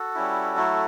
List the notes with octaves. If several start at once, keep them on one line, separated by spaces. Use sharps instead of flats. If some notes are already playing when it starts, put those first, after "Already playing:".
Already playing: F#4 A4
G3 C#4 E4
F#3 A3 E4